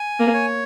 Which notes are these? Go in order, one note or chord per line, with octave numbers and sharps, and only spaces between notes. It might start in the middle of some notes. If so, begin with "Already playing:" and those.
Already playing: G#5
A#3
C#5